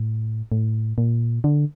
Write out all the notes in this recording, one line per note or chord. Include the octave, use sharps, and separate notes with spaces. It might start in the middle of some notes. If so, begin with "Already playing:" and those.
Already playing: A2
A2
A#2
D3